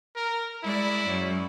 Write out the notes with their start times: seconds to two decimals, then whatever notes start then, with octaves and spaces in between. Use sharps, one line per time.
0.16 A#4
0.64 G#3 E4 D5
1.07 F#2